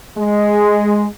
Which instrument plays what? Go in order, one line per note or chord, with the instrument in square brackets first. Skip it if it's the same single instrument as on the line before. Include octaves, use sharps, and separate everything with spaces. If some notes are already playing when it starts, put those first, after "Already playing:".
[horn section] G#3